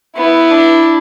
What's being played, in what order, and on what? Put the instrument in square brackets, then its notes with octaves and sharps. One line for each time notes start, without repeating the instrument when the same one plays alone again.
[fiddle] B3 [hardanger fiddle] E4
[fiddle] D4